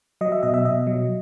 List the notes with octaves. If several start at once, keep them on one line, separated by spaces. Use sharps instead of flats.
F#3 D#5
E5
B2 D#5
E5
B2 D#5
F#3